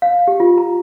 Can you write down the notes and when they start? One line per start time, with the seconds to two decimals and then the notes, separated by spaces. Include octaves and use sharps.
0.02 F5
0.28 G4
0.40 F4
0.58 A#5